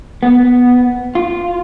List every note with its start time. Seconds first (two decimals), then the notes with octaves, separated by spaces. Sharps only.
0.23 B3
1.15 F4